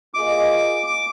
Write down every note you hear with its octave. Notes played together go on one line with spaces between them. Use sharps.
A#3 F4 G#4 D#5 D6
D6